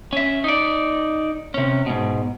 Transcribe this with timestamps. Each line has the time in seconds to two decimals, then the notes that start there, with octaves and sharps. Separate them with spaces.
0.13 C#4 E5
0.44 D#4 D5
1.54 C3 C#4
1.86 G#2 B2